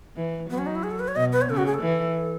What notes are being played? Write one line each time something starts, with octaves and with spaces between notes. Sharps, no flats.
E3
F#3 B3
C#4
D#4
E4
G#4
A4
B4
C#5
B2 D#5
B4
C#5
C#3 A4
F#4
G#4
A4
E3